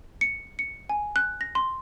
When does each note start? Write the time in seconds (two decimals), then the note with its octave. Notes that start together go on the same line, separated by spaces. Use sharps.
0.21 C#7
0.59 C#7
0.89 G#5
1.16 F#6
1.41 A#6
1.55 C6